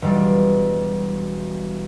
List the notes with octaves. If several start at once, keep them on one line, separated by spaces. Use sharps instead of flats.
E1 G3